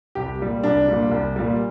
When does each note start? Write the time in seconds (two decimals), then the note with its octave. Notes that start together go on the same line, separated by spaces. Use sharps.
0.15 C2 G4
0.40 A#2 G3
0.63 C2 D4
0.88 A#2 G3
1.11 C2
1.36 A#2 G3